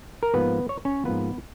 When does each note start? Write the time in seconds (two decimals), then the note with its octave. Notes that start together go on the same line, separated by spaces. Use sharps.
0.23 A#4
0.34 G#2 F3 A#3 B3 B4
0.69 C#5
0.85 C#4 C#5
1.05 G#2 F3 A#3 B3 B4